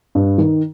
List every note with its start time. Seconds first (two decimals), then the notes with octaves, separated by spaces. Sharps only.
0.15 G2
0.38 D#3